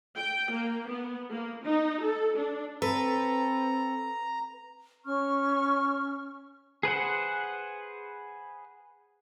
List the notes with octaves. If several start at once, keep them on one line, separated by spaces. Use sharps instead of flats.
G5
A#3
B3
A#3
D#4
A4
D4
C4 A4 B4 A#5
C#4 C#6 F6
G#4 B4 C5 F#5